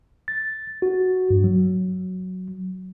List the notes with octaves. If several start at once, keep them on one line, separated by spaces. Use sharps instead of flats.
A6
F#4
G2
F#3